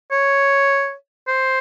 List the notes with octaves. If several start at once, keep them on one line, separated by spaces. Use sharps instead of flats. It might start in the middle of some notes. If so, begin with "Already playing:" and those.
C#5
C5